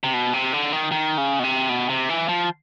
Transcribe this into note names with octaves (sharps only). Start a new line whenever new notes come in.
C3
B2
C3
D3
D#3
D#3
C#3
B2
C3
B2
C3
E3
F3